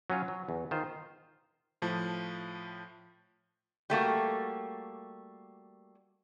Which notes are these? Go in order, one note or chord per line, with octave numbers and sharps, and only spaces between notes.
F#3 C#4 F4
F#3
E2
D#3 F4 C5
A2 F3 A5
G3 A3 A#3 F#4